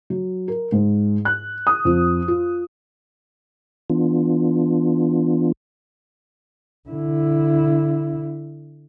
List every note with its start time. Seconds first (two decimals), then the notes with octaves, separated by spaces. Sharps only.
0.10 F#3
0.48 A#4
0.72 G#2
1.25 F#6
1.67 D#6
1.85 F2
2.28 F4
3.90 E3 B3 D4 F4
6.89 D3 E4